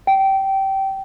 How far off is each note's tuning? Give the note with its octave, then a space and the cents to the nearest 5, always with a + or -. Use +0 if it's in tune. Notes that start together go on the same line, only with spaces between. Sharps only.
G5 -20